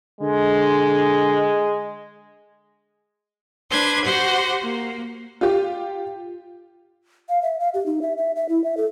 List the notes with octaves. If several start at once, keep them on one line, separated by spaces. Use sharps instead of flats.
D3 G#3
D4 B4 C5 G#6
F#4 G4 C5 F#5
A#3
F4 G4
F5
E5
F5
G4
D#4
E5
E5
E5
E4
E5
A4